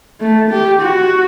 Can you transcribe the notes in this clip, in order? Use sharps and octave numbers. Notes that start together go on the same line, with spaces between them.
A3
G4
F#4